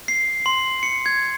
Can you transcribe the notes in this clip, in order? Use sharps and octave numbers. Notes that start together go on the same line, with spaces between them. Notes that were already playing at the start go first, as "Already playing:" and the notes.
C7
C6
C#7
G#6